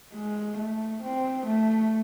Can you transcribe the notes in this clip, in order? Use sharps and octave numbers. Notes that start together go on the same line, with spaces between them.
G#3
A3
C4
A3